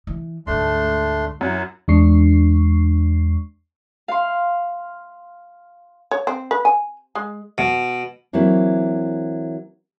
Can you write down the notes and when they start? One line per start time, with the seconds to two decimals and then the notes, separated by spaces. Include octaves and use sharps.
0.07 E3
0.47 D2 G#2 A3 D4 C6
1.41 F#2 E4 F#5
1.88 E2 G#3 D4 C#6 C7
4.08 F5 C6
6.11 C#5
6.27 C4
6.51 B4
6.65 G#5
7.15 G#3
7.58 B2
8.33 E3 F#3 A#3 C4 E4